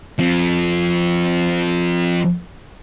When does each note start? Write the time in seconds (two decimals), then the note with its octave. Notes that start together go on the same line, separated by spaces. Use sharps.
0.19 F3 C4